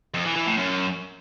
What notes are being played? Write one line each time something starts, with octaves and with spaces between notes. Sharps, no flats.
F2
E3
E3
A2
F#2